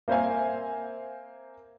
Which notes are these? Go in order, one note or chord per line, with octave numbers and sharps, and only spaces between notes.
A#3 C4 C5 E5 F5 G#5